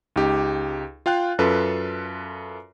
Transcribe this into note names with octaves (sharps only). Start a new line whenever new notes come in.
C#2 D#4 G4
F4 F5 G5 F#6
F#2 F4 A4 B4